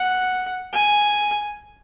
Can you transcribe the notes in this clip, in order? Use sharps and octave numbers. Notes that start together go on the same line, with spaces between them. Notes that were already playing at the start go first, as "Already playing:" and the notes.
Already playing: F#5
G#5